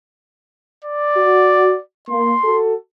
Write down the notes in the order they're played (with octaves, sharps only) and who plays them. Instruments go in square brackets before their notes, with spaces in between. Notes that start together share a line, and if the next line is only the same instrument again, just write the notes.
[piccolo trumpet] D5
[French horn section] F#4
[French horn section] A#3 [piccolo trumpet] C6
[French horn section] F#4 A4